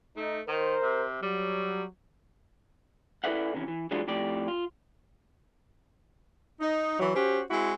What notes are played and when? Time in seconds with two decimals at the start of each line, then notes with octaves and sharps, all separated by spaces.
0.16 A3 D#4
0.48 D#3 A#4 C5
0.82 C3
1.22 F#3 G3
3.24 E4 A4 B4 D5 E5 F#5
3.54 C3 D#3 E3 C#4
3.68 E3
3.91 E3 F#3 G#3 B3 D4 F4
4.07 F2 A2 G4 D5
4.48 F4
6.60 D#4
6.99 E3 F#3
7.15 C#4 F#4 G4 C5
7.50 G#3 C4 E4 F#4